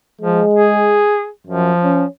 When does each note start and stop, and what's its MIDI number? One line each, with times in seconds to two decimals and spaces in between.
0.21 0.42 53
0.21 1.02 56
0.53 1.29 68
1.47 1.72 42
1.47 2.03 53
1.83 2.05 61